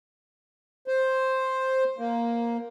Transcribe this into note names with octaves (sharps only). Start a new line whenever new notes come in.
C5
A#3